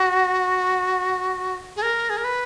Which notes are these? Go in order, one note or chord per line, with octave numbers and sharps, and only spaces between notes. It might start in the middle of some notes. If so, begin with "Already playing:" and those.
Already playing: F#4
G#4
A#4
G#4
A#4
B4